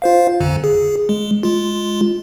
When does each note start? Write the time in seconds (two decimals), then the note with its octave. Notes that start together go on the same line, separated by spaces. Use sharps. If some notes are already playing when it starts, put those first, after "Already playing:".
0.02 F4 C5 F5
0.40 A1 F2 D3
0.64 G#4
1.09 G#3
1.43 G#3 F4